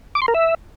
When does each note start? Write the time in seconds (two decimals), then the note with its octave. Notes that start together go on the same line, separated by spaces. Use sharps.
0.15 D6
0.22 C6
0.28 A#4
0.35 E5